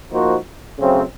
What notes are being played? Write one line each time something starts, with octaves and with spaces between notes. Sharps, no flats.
F3 A#3 D#4 F#4 C5
C#3 F#3 A3 C4